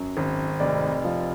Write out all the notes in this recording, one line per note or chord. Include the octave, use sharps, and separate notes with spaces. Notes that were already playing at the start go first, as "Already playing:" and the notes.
Already playing: F#2
G#1
F1 D5
F3